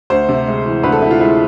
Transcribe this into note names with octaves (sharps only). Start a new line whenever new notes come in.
D2 C5
C3
G#3
E3
D2 B4
A4
C3 E4
F4
G#3 E4